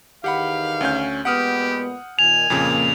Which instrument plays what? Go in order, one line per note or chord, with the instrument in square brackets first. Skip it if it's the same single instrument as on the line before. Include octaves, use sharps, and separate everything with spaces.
[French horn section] E2 D#3 [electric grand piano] G4 F#5 B5 [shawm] F5
[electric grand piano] D2 C#4 G6
[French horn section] A#2 G#3 B3 [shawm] G4 [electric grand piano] F#5 D#6 F6
[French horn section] A#2 D#3 [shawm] G#5 [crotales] F7
[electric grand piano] F2 A#2 C#3 [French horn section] A#3